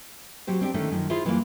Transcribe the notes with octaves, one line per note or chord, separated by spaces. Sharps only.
F#3 C4 G4 C5
C4 D4 G4
D3 D#3 A3 C#4
F#2 D#3 F3
E4 F4 G#4 C5
F#2 E3 G3 G#3 A#3 F4